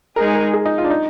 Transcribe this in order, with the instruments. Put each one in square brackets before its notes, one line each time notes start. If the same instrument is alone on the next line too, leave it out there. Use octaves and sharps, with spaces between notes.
[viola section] G#3 D#4 G#4 [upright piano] A#4
[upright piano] A#4
G#4
D#4
F4
D4
D#4